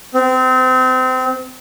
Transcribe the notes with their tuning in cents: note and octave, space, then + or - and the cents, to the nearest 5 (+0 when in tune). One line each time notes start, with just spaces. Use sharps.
C4 -30